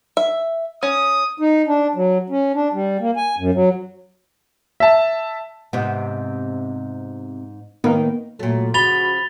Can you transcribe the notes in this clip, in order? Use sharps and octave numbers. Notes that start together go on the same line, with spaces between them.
E5
C#4 D#6
D#4
D4
F#3
C#4
D4
G3
A#3
G#5
F#2
F#3
E5 A5
G#2 C3 B3
A2 D#3 A#3 B3 D#4 A#4
A#2 F#3 A3
C#3 F3 F#4 B5 A6 F7 G7